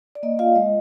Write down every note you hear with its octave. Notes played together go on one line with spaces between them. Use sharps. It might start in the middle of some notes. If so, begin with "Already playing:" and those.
D5
A#3 D#5
F4 F5
G#3 D#5